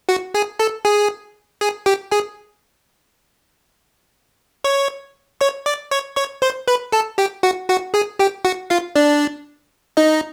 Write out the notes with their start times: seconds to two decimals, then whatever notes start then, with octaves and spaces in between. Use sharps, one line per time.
0.09 F#4 F#5
0.34 G#4 G#5
0.59 A4 A5
0.85 G#4 G#5
1.61 G#4 G#5
1.86 G4 G5
2.11 G#4 G#5
4.64 C#5 C#6
5.41 C#5 C#6
5.66 D5 D6
5.91 C#5 C#6
6.16 C#5 C#6
6.42 C5 C6
6.68 B4 B5
6.92 A4 A5
7.18 G4 G5
7.43 F#4 F#5
7.69 F#4 F#5
7.94 G#4 G#5
8.19 G4 G5
8.45 F#4 F#5
8.70 F4 F5
8.96 D4 D5
9.97 D#4 D#5